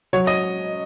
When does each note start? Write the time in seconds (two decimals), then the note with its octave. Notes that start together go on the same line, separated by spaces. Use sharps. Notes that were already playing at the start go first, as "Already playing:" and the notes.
0.13 F#3 C#5
0.27 D#5